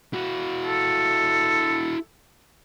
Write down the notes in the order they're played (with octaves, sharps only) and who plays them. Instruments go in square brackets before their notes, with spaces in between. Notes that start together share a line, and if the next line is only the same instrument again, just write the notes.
[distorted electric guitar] E4 F#4
[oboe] A4